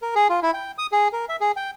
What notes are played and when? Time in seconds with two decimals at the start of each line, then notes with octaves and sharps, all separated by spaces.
0.02 A#4
0.15 G#4
0.30 F4
0.43 E4
0.54 G5
0.78 D#6
0.92 G#4
1.13 A#4
1.29 E5
1.40 G#4
1.56 G5